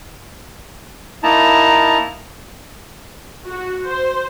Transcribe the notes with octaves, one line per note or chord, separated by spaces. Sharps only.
A#3 D#4 E4 A5 A#5
F#4
C5